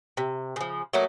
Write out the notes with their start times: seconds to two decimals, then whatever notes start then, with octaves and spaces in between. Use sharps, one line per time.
0.17 C3
0.56 C#3 F3
0.93 F#3 A3 A#3 D#4